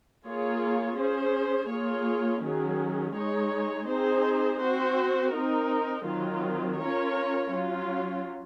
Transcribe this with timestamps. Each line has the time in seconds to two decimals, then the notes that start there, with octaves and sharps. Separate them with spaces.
0.24 A#3 F4 G#4 C#5
0.97 C#4 G#4 C5
1.70 A#3 F4 G#4 C#5
2.42 D#3 F#3 C#4 G#4
3.15 G#3 D#4 G#4 C#5
3.88 C4 D#4 G#4 C5
4.61 C4 F#4 C5
5.34 C4 D#4 A#4
6.07 D#3 F#3 C4 F4
6.80 C#4 F4 A#4 C#5
7.52 F#3 C#4 F4